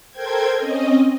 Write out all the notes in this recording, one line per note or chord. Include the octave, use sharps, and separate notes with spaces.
A4 A#4 C5 G5 G#6
C4 C#4 D#5